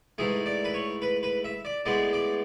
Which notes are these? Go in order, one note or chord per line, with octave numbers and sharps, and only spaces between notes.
G#2 E3 A3 G#4
D5
B4
C#5
B4
B4
E5
D5
A2 G#3 B3 D5
D5